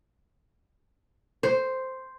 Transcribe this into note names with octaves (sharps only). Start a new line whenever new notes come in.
C5